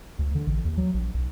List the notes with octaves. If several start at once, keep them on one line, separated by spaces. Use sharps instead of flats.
D2
D3
A1
D#2
F#3
A#1
B1